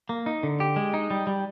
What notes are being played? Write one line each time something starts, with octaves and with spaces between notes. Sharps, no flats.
A#3
D#4
D3
G4
G#3
D#4
G3
G3